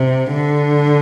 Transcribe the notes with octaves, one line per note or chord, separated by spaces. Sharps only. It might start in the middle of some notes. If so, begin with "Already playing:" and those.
Already playing: C3
D3